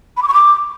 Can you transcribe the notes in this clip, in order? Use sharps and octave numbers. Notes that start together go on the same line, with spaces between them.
B5
D6
C#6
D6